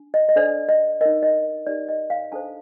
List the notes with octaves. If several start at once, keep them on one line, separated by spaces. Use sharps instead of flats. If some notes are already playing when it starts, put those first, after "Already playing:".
Already playing: D4
D#5
D#5
D4 A4 C5 D5
D#5
D#4 A#4 D#5
D#5
D#4 G4 A#4 D5
D#5
F5
D4 A4 C5 A5